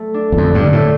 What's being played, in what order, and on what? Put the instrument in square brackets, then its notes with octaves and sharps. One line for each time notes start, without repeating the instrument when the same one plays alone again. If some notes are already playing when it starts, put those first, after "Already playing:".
Already playing: [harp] A3
D4
[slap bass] E2
[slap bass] F2 [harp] D3
[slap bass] G2
[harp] D3
[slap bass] A2